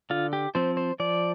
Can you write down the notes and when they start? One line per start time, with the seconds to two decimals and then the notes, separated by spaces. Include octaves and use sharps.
0.10 D3 F4
0.33 G4
0.55 F3 C4 C5
0.77 C5
1.00 F3 D5